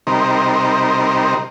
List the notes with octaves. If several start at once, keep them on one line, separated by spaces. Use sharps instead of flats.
C3 G3 D#4 A#4 C5